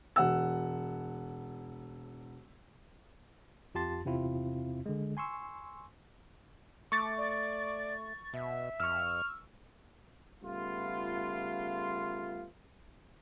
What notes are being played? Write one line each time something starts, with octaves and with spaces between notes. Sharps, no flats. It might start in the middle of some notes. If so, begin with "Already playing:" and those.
E1 F#5 E6
F2 F4 G4 A5 C6 A6
E2 C3 C4 E4 F4
D3 G#3
G#5 C6 C#6 E6
A3 C#6 D6 A6
D5
B2 E5
F2 C#6 E6 F6
C#3 G3 A3 B3 F4